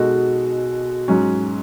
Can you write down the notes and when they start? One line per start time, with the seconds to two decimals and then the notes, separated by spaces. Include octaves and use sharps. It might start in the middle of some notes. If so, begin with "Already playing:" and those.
Already playing: B2 G#3 D#4 F#4 A4
1.08 G#2 F#3 C#4